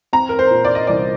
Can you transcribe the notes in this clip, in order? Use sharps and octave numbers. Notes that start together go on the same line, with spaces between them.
C4 A#5
A#4
C5
A#2
D5
D#5
C2 D5